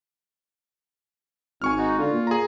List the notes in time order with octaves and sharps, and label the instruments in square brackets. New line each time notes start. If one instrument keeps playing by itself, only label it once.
[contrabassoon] G#1 [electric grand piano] G#5 C#6 F6
[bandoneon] D#4 F#4
[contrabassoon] D3 [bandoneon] F4
[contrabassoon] A#2
[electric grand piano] G#4 A#5